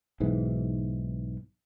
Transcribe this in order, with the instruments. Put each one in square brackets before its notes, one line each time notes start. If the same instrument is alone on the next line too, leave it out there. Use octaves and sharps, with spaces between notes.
[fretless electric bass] B1 G#2 E3